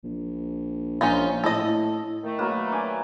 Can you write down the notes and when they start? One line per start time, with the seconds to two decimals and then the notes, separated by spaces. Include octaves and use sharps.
0.04 A#1
1.01 A#1 C#4 D#4 F4
1.44 A2 A4 D#5
2.24 D#3 A3
2.39 F#3 A#3 B4
2.72 D5 E5 G#5